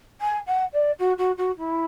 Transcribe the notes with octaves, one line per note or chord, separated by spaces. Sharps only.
G#5
F#5
D5
F#4
F#4
F#4
E4